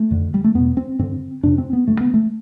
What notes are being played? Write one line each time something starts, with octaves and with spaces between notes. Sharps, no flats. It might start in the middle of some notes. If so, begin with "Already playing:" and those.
Already playing: A3
F2 D3
G3
A3
E2 B2 B3
C4
G2 D3 C4
F2 C3 D4
C4
B3
G2 D3 A3
B3
A3